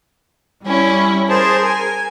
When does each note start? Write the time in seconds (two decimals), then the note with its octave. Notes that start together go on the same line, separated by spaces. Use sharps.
0.64 G3 C#4 E4
1.29 G#4 A#4 C5 A5
1.65 G#5